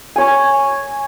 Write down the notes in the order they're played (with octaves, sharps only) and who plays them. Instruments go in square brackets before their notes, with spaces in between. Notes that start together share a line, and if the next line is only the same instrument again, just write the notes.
[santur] C#5 G#5